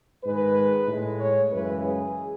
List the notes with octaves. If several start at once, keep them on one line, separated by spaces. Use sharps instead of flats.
G#2 D#3 G#3 B4
A2 G#3
C#5
F#2 C#3 E3 G#3 B4
G#4